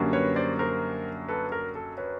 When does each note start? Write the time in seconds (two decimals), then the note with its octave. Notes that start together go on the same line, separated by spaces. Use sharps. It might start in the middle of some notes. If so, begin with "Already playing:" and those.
Already playing: F#2 D3 G3 A#3 C#4
0.13 B4 C#5
0.36 C5 D5
0.59 A#4 C5
1.28 A4 B4
1.52 A#4
1.75 A4
1.98 B4 C#5